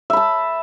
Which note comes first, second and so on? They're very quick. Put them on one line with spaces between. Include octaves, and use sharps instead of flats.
E5 B5 A5